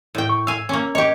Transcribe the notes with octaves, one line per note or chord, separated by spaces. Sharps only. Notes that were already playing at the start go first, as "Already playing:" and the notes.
A2 G5
C#6
F5 G#5 E6
A#3 C#4
G4 C#5 D#5